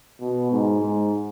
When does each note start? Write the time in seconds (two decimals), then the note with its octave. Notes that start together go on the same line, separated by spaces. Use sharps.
0.21 B2
0.52 G#2
0.81 G#2